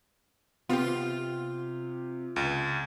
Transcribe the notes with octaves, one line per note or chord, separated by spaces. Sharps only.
C3 B3 C4 F4 G4
C#2